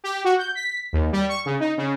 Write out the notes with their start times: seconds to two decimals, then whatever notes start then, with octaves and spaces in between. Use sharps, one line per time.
0.04 G4
0.24 F#4
0.38 G6
0.55 B6
0.93 D#2
1.12 G3
1.29 C#6
1.46 C#3
1.60 D#4
1.77 C#3